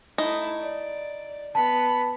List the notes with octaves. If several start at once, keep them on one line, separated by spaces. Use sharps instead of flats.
A3 D#4 E4
D5
B3 A5 B5